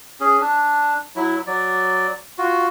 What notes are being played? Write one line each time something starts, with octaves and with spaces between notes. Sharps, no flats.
C#4 G#4
D4
F#3 E4
F#3 D5
F4 F#4